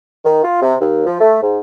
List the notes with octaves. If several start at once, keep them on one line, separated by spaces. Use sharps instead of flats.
D#3
F4
C3
D#2
F3
A3
G#2